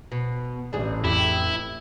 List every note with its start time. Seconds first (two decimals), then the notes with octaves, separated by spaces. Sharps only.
0.12 B2
0.73 A1 D4 G#4
1.04 F2 D4 E4 G4